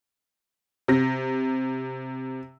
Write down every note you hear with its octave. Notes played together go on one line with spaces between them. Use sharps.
C3 A#6